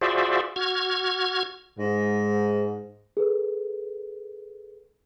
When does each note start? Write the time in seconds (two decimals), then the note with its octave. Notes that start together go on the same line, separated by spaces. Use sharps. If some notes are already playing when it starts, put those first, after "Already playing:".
0.01 F4 F#4 G#4 C5 D5 E5
0.56 F#4 F6 G#6
1.78 G#2
3.17 G#4 A4 B4